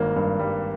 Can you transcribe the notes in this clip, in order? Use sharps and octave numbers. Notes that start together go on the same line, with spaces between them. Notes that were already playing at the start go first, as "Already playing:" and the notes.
Already playing: G#1 G2 A#3
G2
G3